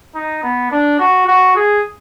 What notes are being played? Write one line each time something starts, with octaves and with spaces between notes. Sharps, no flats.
D#4
B3
D4
F#4
F#4
G#4